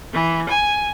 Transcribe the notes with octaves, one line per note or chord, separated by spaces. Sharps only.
E3
G#5